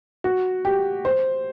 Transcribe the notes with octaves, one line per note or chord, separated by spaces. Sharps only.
F#4
G4
C5